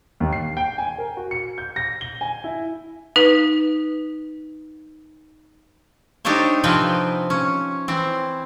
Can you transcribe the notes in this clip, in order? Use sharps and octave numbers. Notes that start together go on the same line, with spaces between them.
D#2
C7
G5
G#5
A#4
F#4
C#7
G6
A#6
G7
G#5
E4
D#4 B4
D4 D#4 G4 A4 C5 C#5
C3 F3 C4 B4 G5 G#5
C#4
E3 C4